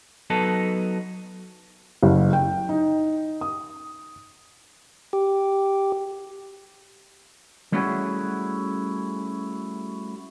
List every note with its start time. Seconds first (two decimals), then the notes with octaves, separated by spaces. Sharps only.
0.30 F#3 B3 D#4 A4
2.03 F#1
2.33 G5
2.69 D#4
3.41 D#6
5.13 G4
7.72 G3 A3 C#4 E4 F#4 G#4